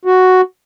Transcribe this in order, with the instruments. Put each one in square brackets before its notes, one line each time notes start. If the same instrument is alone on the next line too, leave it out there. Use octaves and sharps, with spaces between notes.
[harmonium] F#4